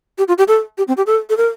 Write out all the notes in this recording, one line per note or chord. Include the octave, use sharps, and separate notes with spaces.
G4
F4
G4
A4
G4
C4
G4
A4
A4
A#4